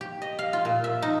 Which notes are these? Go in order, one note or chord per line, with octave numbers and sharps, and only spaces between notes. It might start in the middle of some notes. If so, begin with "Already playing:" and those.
G4
D#5
F5
F4
A#2
E5
D#4